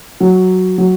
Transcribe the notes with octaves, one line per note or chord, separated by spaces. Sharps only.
F#3
F#3